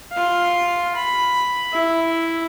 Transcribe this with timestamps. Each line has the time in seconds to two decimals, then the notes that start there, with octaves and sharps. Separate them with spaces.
0.12 F4 F5
0.96 B5
1.73 E4